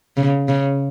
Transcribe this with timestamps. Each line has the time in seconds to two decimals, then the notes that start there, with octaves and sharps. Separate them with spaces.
0.17 C#3
0.48 C#3